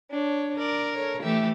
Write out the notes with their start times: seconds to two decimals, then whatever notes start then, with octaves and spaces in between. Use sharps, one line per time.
0.10 D4 C#5
0.58 A#4 D5
0.93 A4 C#5
1.23 E3 A3 G4 E5